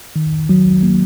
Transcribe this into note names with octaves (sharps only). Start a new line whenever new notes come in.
D#3
F#3
A#3